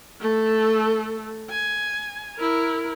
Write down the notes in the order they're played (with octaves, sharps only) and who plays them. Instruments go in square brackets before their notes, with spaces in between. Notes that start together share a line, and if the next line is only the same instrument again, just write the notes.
[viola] A3 A4
G#5
E4 A#4